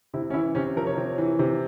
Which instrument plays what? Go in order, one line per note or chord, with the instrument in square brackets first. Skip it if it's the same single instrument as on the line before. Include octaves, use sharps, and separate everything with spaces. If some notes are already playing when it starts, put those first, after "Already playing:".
[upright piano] C3 E4
C#4
E3 E4
C3 C#4
F3 A#4
C#5
C3
E3
C3